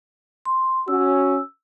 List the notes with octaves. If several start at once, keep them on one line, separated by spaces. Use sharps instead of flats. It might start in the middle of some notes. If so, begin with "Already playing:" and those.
C6
C#4 F#4 E6